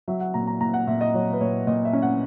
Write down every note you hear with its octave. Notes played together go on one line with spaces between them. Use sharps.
F#3 E5
F#5
A#2 A#5
A#5
A#2 A#5
F#5
A#2 E5
D#5
F#3 C#5
B4
A#2 C#5
A#2 D#5
E5
C#4
F#5